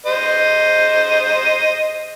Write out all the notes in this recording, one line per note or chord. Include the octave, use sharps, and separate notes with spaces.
C5 D#5